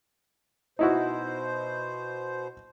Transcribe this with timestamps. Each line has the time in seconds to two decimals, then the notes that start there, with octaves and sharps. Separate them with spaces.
0.79 B2 D#4 E4 F#4 C5